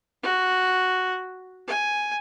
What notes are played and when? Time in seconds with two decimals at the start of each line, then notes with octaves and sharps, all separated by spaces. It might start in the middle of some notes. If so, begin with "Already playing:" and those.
0.23 F#4
1.67 G#5